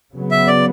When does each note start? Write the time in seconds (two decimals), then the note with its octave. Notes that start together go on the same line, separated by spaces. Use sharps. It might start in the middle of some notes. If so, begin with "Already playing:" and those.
0.14 C#3 F#3 B3
0.31 E5
0.48 D5